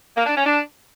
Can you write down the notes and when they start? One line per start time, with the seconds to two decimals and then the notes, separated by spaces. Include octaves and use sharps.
0.16 A#3
0.26 D4
0.35 C#4
0.45 D4